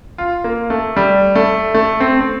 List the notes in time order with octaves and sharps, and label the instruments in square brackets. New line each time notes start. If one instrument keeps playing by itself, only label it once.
[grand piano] F4
A#3
A3
G3
A3
A3
C4
C4